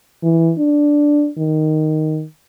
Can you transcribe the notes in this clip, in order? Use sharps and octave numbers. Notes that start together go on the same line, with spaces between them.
E3
D4
D#3